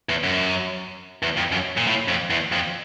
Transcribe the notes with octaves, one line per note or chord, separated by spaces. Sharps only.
E2
F#2
E2
F2
F#2
A#2
A2
F2
E2
F2